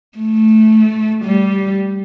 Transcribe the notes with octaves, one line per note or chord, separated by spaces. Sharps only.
A3
G3